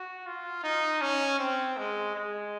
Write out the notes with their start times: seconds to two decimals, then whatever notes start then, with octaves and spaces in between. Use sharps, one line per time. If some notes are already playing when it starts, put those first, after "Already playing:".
Already playing: F#4
0.27 F4
0.63 D#4
1.01 C#4
1.39 C4
1.77 G#3
2.15 G#3